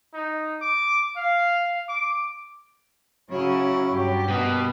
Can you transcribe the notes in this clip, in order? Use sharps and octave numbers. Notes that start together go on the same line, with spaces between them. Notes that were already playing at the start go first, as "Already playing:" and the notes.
D#4
D6
F5
D6
C#3 F#3 C#4 E4 C#5
G2 G4
B2 A#3 B4